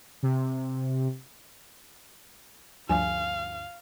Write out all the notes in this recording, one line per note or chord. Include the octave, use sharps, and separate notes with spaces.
C3
D2 G2 F3 F5 G#5